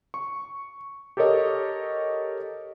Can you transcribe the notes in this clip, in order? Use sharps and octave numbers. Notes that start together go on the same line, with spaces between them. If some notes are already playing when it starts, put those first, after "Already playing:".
C#6
G4 A4 A#4 C#5 D#5